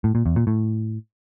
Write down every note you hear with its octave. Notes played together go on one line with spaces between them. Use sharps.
A2
A#2
E2
A#2
A2